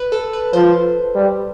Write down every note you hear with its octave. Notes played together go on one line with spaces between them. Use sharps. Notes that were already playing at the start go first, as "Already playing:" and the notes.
Already playing: B4
A4
B4
F3 C5
G3